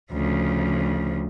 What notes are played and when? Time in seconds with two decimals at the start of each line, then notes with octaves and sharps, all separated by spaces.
0.10 D2 C#3 F3